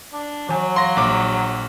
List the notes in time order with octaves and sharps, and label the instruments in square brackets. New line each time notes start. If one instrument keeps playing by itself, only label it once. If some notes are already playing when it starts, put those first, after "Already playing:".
[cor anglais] D4
[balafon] E3 G#5 [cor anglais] F#3
[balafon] F5 [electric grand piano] C6 A#6
[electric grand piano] A#1 D6